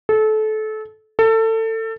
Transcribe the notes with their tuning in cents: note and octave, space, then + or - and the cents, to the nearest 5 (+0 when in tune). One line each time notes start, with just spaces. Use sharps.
A4 -25
A4 +25